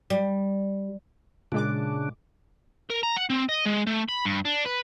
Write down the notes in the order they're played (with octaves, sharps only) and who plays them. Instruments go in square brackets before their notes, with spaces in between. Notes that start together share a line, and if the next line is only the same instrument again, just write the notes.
[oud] G3
[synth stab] A#2 G#3 D6 [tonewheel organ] C#3 D4
[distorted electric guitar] A#4
A#5
F#5
C4
D#5
G#3
A3
B5
G2
D4
B4